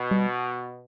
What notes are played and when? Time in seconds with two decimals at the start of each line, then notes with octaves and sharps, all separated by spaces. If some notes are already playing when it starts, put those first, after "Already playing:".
Already playing: B2
0.11 G3